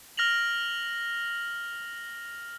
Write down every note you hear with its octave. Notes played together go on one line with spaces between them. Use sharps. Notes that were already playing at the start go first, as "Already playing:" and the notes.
F6 A#6 F7 F#7